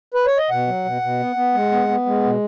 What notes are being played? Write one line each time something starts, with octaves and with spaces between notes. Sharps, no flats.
B4
C#5
D#5
B2 F#5
F#3
B2
B2
B3
B3
G#3
B3
B3
G#3
B2